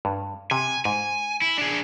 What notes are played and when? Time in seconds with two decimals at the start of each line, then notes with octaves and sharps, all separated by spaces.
0.05 G2
0.51 C3 G#5
0.85 G#2 G#5
1.42 E4
1.58 D4 G#4